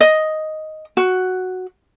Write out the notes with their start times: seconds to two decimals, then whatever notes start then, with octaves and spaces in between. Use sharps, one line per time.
0.01 D#5
0.97 F#4